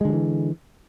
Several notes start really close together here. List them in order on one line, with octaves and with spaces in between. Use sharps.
G#3 D3 F#3 E3